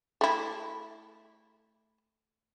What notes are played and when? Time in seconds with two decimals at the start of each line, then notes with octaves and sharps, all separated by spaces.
0.21 A3 E4